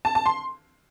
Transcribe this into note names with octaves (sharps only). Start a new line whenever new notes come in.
A5
A5
C6